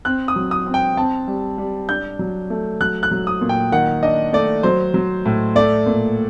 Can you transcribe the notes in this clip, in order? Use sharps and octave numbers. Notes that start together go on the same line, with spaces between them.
C4 F#6
D#6
F#3
D#6
C4
G5
C4 A5
G3
G3
D4 G6
F#3
A3
F#3 F#6
F#6
F#3
D#6
A#2
G5
D#3 F#5
D4 D#5
A3 D5
F#3 C5
F#3
A2
A3 D5
A#2